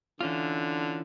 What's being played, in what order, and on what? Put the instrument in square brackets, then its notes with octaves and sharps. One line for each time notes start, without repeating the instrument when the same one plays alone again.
[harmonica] D3 [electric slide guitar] E3 C#4 F4